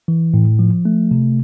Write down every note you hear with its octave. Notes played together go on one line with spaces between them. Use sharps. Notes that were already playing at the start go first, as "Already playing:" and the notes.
E3
A2
F3
A3
C3